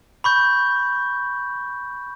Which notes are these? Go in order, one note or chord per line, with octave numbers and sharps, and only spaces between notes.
B5 C#6 G6